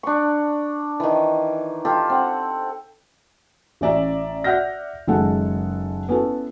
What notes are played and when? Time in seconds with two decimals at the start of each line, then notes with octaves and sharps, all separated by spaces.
0.03 D4 C#6
1.00 D#3 E3
1.85 F4 G4 A4
2.10 C4 F#5
3.81 A1 C#4 D5 E5 A#5
4.44 D5 E5 F#5 F6 G6 A#6
5.07 F#1 D#3 G#3 A4 F#5
6.09 B3 C#4 E4 A4